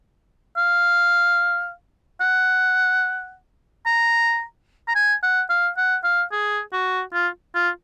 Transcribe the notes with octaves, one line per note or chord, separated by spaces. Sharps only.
F5
F#5
A#5
A#5
G#5
F#5
F5
F#5
F5
G#4
F#4
F4
F4